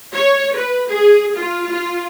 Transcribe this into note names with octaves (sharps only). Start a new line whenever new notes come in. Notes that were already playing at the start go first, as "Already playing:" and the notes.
C#5
B4
G#4
F4
F4